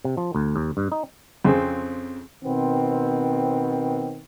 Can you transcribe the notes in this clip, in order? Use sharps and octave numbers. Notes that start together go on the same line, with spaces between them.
C3
F3
D2
D#2
G2
D#4
F2 C#3 C4
B2 D#3 B3 C4